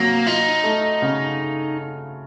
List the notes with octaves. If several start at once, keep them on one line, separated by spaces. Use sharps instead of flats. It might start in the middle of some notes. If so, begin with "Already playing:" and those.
Already playing: C3 F#3 A#3
D#4 F4
A3
C#3